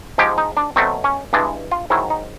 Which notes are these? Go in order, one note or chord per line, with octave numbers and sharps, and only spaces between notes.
G#2 F3 G#3 G4
D#4
D4
B2 F#3 A3 C4
C#4
G2 E3 G#3 D4
F4
G#2 D#3 F#3 E4
D#4